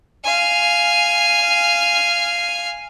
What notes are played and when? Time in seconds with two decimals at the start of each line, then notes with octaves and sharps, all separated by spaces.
0.24 F5 G#5